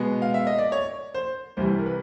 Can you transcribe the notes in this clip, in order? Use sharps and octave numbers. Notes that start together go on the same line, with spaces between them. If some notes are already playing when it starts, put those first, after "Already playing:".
Already playing: B2 G#3 B3
F5
E5
D#5
D5
C#5
C5
C2 C3 E3 G3 C5
A#4
B4